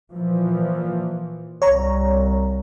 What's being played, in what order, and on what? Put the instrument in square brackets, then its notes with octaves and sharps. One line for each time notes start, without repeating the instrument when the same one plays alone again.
[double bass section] A#2 E3 F3
[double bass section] C2 [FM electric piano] C#5 A#5